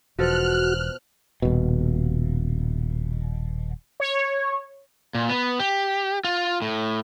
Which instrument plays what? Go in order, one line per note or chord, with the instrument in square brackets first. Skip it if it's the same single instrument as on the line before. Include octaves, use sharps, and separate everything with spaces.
[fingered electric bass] E1 [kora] B2 F3 A4 [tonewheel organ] F#4 [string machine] F6 F#6
[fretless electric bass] D#1 B2
[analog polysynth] C#5
[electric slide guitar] A#2
B3
G4
F4
A2